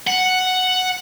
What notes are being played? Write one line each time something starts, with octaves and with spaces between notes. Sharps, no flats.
F#5